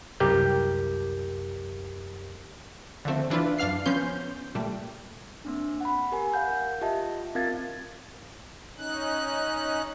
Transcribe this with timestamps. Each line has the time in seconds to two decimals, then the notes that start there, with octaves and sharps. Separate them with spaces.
0.20 C2 F#2 G4 A#4 G6
3.05 D3 F3 A3 C4
3.30 E3 D4 E4 F4 B4
3.58 F#2 D4 F5 F6 C7
3.86 F3 B3 C#4 C6 G6
4.55 A#2 G3 A3
5.45 A#3 C4 D4
5.81 F#5 B5
6.12 G4 A#4 G#5
6.34 A#4 F5 F#5 G6
6.81 F4 G4 D#5 E5 A5
7.35 C4 F4 A#4 F5 G#6 A6
8.77 C#4 D#4 F#6